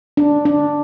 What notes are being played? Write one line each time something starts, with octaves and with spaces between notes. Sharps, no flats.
D4
D4